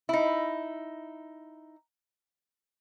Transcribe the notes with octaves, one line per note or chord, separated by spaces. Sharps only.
D#4 E4